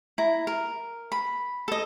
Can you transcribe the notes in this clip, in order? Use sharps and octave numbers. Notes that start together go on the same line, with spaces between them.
E4 A#5
A#4
B5
A4 D#5